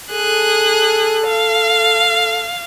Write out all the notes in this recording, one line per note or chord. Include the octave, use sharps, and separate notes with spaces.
G#4 A4 F#6
F5